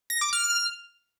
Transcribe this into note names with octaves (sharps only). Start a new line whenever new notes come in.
A#6
D6
F6